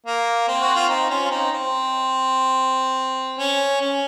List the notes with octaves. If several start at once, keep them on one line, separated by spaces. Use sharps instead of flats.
A#3
C4
F#4
F4
C4 D#4
C#4 F4
F4
C4 D#4
C4
C#4
C#4